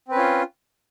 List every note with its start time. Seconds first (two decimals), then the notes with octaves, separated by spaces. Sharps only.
0.08 C4
0.12 B4
0.15 C#4
0.18 F4